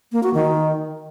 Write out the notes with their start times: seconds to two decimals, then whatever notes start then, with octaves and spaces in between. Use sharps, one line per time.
0.12 A#3
0.23 F#4
0.34 D#3